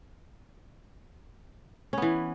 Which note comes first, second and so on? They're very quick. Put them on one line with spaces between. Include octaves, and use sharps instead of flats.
C#4 B3 E3